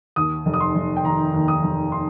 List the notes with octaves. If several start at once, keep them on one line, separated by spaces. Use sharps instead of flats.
D#2 D#6
F1
D#6
C6
F1
G5
D#3 A#5
D#2
D#6
F1
C6